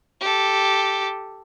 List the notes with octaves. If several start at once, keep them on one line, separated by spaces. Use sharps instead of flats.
G4 A4